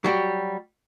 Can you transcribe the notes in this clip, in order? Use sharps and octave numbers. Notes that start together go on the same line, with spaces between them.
F#3 G3 F#4 G4